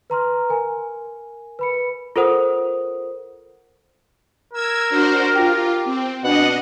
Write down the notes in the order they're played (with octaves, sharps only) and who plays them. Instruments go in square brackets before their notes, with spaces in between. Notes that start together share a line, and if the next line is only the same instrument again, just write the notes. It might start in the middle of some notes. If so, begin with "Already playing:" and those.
[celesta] B4 A#5 C6 F6
A#4 G#5
B4 B5 C#7
F4 A4 A#4 C5 F#5 D#6
[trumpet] A#4 [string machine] E6 G#6
[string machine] D4 F#4 C5
[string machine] F4 [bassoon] G4
[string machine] C4
[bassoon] B2 [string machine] D4 D#5 [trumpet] F#5